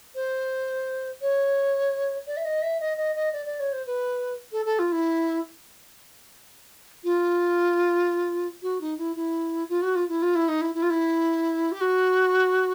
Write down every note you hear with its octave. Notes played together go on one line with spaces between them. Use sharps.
C5
C#5
D5
E5
D#5
E5
D#5
D#5
D#5
D5
D5
C#5
C5
B4
A4
A4
F4
E4
F4
F#4
D#4
E4
E4
F4
F#4
F4
E4
F4
E4
D#4
E4
E4
F4
E4
G4
F#4